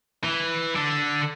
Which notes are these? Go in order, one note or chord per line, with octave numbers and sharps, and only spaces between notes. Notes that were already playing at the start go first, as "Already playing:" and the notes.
E3
D3 D4